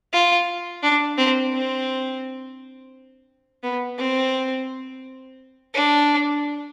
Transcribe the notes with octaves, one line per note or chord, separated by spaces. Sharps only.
F4
D4
C4
C4
B3
C4
D4